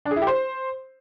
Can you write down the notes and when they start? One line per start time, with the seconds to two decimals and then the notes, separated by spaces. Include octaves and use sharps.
0.05 D4
0.11 G#4
0.16 E4
0.22 G4
0.27 C5